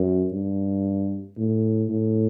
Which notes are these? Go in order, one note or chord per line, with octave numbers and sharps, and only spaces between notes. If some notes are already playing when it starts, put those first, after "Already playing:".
Already playing: F#2
G2
A2
A2